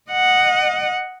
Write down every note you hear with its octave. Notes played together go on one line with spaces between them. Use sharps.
D#5 F#5